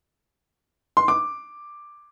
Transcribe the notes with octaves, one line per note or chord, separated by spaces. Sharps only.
C6
D6